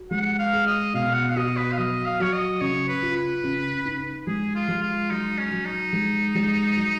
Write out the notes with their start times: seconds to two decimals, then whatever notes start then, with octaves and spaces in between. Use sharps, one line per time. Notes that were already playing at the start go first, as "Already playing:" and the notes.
Already playing: F#4
0.11 G#3 F#5
0.39 F5
0.53 G#4
0.66 D#5
0.94 B2 F5
1.15 F#5
1.30 F5
1.36 F#4 D#5
1.57 B4
1.72 F5
1.77 F#3 D#5
2.05 F5
2.20 F#3 C#5
2.33 D#5
2.61 C#3 C#5
2.88 B4
3.02 F4
3.16 B4
3.44 C#3
3.85 D#4
4.27 G#3 G#4
4.55 F4
4.68 G#3
4.82 F4
5.10 F#3 D#4
5.38 C#4
5.51 F#3
5.65 D#4
5.93 G#3
6.35 G#3
6.76 F#3